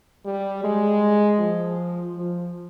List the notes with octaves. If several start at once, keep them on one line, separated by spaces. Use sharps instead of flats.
G3
G#3
F3
F3